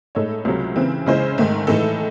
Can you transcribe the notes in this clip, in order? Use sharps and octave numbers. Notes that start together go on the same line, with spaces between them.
A2 G#3 D#4 A4 C#5
C#2 C3 F#3
C#3 E3 C4
C#3 G#3 C#4 E4 C5
G#2 D#3 A3 D#4
A2 E3 G#3 D#4 A4